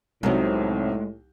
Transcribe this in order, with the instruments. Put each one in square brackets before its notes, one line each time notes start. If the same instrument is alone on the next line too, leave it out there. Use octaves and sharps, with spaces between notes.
[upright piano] C2 F#3 D#4 [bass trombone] A2 [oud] C3 B3 [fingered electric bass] G#3 A3